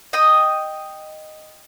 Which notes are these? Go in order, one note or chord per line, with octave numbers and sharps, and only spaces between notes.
D#5 G5 D#6